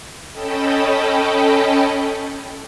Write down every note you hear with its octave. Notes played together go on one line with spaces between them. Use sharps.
C#4 A4 D#5 G5 A5 B5